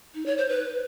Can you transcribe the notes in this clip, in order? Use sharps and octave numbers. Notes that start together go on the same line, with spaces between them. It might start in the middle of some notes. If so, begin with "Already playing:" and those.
D#4
C#5
C5
B4